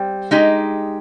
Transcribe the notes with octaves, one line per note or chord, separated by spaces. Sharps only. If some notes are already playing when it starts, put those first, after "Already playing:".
Already playing: G3 C4
G#3 D#4 G4